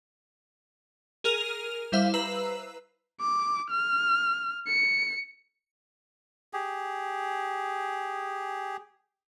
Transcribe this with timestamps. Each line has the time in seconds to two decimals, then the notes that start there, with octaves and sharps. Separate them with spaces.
1.24 G#4 A#4 F6 D#7 F7
1.92 G3 E4 C5 E5 F5
2.14 B4 A#5 E6 C7 E7
3.20 D6
3.70 F6
4.67 C#7
6.53 G4 G#4